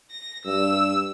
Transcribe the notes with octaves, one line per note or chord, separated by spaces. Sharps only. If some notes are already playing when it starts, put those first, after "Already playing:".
A#6
G2 E6